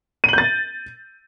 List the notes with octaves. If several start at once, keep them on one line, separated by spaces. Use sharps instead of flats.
G6 A6 D#7 F#7